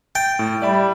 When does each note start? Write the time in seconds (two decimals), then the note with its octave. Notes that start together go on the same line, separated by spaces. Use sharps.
0.15 G5 A6
0.39 A2
0.62 G3 D5 E5 B5